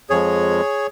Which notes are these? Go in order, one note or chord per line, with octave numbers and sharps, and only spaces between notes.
F2 F3 G#3 G#4 C#5